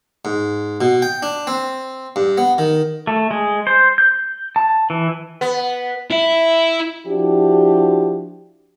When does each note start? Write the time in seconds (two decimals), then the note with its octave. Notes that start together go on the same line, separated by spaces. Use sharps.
0.25 G#2
0.81 B2
1.02 G5
1.23 D4
1.47 C4
2.16 G2
2.38 B3
2.58 D#3
3.07 A3
3.31 G#3
3.67 C5
3.98 G6
4.56 A5
4.90 E3
5.41 B3
6.11 E4 E5
7.06 F3 D4 E4 F#4 G4